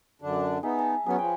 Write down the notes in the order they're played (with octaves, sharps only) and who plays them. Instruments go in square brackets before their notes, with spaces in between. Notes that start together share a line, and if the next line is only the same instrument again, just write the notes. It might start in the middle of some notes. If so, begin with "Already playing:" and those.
[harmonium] F#2 D3 D4
[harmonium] B3 D#4 [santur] G#4 E5
[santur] A5 A#5
[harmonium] F#3 B3 C#4 [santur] G#4 B4 C#5
[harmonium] F3 [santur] G5